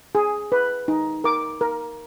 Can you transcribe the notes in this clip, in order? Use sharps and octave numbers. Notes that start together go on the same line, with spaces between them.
G#4
B4
D#4
A#4 D6
A#4